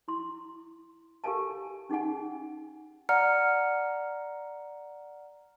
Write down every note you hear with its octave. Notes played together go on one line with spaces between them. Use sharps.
E4 C6
G4 A4 A#4 F5 G#5 A5
C#4 D#4 G#4 F#5 G#5
D5 F#5 A#5 F6 C#7